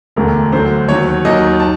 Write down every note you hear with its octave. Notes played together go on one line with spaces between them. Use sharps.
E1 D2 D3 A#4
D2 D3 F#3 C5
D#2 D#3 F#3 C#5
D#2 D#3 F#3 D#5
A5